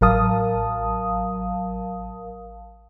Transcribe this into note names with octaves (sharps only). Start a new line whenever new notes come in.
A1 F#3 A#4 F5 A5 D#6